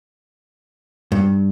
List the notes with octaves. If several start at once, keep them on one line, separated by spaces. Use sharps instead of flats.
G2